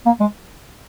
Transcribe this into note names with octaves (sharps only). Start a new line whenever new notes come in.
A#3
G#3